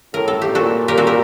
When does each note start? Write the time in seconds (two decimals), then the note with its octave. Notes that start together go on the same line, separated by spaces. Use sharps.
0.14 A2 A#4
0.28 A4
0.42 G4
0.52 A#2 F#4 A4
0.88 G4 A#4
0.97 F#4 A4
1.07 G4 A#4